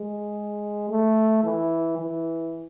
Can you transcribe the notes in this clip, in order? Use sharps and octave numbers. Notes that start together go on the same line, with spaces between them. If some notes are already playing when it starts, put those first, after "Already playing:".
Already playing: G#3
A3
E3
E3